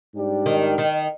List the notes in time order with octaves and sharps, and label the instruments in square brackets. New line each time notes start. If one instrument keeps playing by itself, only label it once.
[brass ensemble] G#2 G3 D4 G4 D5
[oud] D#3
D#3